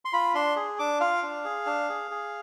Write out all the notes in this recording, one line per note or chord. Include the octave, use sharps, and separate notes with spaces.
C6
F4 B5
D4 C6
G#4
D4 D6
F4 F5
D4
G#4
D4
G#4
G#4